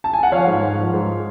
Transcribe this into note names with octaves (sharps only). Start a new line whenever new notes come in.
A5
G#5
F#5
F3 C#5 F5
G#2
G#2
F3
G#2